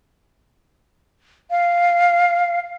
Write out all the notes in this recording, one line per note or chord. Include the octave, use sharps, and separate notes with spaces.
F5